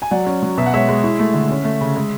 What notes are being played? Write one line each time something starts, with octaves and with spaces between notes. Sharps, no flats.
G#5
F#3 D5 F#5
C#4
F#3
B2 E5
F#5
G#3 C#5 E5
G#3
E4
A3
D3
C#4
A3
C#3
G#3